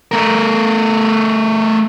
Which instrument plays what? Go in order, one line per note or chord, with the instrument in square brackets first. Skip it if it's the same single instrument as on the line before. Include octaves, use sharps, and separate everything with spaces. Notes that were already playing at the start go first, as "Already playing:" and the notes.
[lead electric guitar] A3 A#4